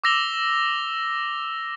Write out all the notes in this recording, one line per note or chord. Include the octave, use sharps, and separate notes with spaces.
D6 E6 A#6 F7 G7